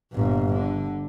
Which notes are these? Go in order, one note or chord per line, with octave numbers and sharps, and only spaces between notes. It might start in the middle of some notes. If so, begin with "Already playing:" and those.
G1 A#2
D3